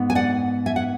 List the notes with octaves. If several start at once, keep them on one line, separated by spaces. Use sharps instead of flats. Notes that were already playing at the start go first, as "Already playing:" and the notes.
Already playing: G#2 B3
G#5
D5 F#5
E5 G#5
F#5